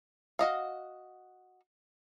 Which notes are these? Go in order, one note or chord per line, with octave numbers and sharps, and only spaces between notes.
F#4 D#5 F5